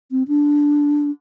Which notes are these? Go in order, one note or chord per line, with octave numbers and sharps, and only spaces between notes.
C4
D4